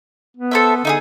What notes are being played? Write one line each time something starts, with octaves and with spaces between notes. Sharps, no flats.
B3
A4 C5 E5
D3 D#4 E4 G#4